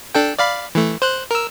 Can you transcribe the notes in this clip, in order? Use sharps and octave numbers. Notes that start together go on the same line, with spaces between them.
D4 A4 G5
D5 F5 B5
E3 A3
C5 F#6
A#4 E6